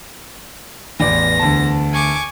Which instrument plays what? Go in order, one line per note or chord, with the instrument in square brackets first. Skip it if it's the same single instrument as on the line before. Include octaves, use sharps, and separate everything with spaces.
[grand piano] A1 D5 [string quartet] E2 A#6
[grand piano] D2 A5
[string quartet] G#5 C#6 D6